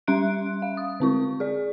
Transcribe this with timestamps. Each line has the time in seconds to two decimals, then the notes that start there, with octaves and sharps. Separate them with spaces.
0.07 G3 C#4 E5 C6 F#6 D7
0.62 F5
0.77 D#6
1.00 D3 C4 E4 C#6
1.40 G#4 D5